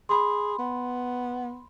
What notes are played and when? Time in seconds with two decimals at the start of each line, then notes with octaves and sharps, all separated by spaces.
0.09 G#4 B5 C6
0.59 B3